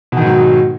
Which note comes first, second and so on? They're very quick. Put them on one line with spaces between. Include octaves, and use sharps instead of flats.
B2 D#3 G#2 F#3